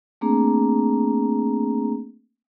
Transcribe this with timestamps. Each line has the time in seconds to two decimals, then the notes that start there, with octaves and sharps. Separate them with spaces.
0.21 A3 A#3 C4 D4 G#4 A#5